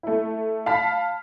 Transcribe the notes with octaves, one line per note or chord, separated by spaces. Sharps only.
A3 E4
F5 A5 B5 F6 B6